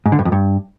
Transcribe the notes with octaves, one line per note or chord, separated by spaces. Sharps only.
G#2
D3
G2
F2
G2